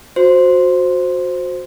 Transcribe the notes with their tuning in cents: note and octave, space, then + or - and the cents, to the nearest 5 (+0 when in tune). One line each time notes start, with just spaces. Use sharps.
F#4 -20 C5 +0